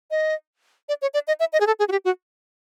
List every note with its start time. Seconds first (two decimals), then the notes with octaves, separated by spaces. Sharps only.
0.11 D#5
0.89 D5
1.02 C#5
1.14 D5
1.28 D#5
1.40 E5
1.53 D#5
1.61 G#4
1.67 A4
1.79 G#4
1.88 F#4
1.92 G4
2.05 F#4